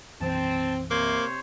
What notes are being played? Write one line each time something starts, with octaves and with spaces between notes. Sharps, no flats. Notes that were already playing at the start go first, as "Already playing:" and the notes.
B1 F#2 E3 C4 A5
C3 A#3 C5 C#5